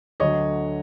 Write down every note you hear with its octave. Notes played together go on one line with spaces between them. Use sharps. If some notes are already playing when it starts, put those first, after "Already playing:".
D2 D3 F#3 C#5 D#5